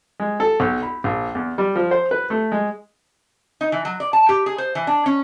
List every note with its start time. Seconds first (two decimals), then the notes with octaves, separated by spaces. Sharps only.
0.20 G#3
0.40 A4
0.60 B1
0.83 B5
1.04 A#1
1.35 E2
1.58 G3
1.76 F3
1.91 C5
2.11 B4
2.30 A3
2.52 G#3
3.61 D#4
3.72 E3
3.85 F#3
4.00 D5
4.13 A5
4.29 G4
4.46 G#4
4.58 C5
4.75 E3
4.87 D4
5.06 C#4